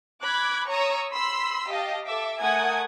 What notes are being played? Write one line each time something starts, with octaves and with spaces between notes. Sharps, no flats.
B5 D6 F#6 G#6
C#5 A#5 C#6 D#6 E6
B5 C6 E6 B6
G4 D#5 F5 A5
A4 E5 D6
A3 A#4 F#5 G#5 D#6 G#6